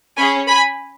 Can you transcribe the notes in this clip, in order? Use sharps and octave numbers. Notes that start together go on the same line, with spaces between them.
C#4 G#5 B5
G#4
G#5 B5